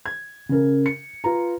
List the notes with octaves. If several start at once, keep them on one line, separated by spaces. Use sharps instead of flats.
G#6
C#3 A#4
C#7
F4 B4 A#5